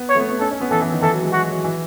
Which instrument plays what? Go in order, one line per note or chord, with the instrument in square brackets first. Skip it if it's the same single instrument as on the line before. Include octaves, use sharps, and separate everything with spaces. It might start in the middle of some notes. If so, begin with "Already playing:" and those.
Already playing: [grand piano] B3
[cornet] C#5
[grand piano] A3
B3
B3
[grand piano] C#4 [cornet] A4
[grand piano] C#4
B3
[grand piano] E3 [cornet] A4
[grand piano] E3
D#3
[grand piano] E3 [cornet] A4
[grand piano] F#3
G#3
[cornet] F#4
[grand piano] F#3
E3